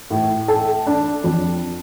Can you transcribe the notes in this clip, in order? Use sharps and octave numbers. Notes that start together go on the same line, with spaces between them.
A2
A4
D4
F2